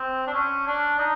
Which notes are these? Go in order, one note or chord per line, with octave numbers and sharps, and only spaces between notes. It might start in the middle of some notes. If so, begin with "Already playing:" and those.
Already playing: C4
D4
C#4
D4
D#4